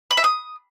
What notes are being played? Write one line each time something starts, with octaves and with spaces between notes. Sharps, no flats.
B5
E5
D#6